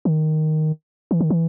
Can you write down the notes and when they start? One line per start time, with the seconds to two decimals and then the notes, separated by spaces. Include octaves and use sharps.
0.05 D#3
1.11 E3
1.21 D#3
1.30 E3